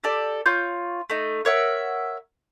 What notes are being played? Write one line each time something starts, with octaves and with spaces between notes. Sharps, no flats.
G4 A4 D5
F4 C#5 C#6 G6
A3 D#4
A#4 C#5 E5 F#5